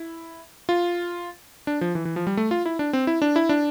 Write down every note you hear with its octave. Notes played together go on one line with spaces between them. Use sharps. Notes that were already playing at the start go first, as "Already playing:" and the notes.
Already playing: E4
F4
D4
F3
E3
E3
F3
G3
A3
F4
E4
D4
C4
E4
D4
E4
D4